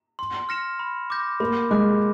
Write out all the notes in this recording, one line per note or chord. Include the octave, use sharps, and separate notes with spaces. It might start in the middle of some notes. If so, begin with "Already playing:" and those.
C6
F6 A#6 C#7 E7
B5
D6 G6 A#6
A#3 B5
G#3 D6 F#6